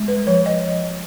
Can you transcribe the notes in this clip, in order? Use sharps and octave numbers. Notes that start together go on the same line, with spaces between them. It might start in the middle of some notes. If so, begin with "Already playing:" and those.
Already playing: G#3
B4
F3 C#5
D#5